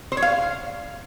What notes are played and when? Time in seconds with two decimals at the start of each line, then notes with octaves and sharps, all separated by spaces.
0.12 C5
0.17 C#5
0.22 F5